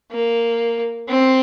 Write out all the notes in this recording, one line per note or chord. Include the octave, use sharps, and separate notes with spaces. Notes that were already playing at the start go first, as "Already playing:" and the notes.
A#3
C4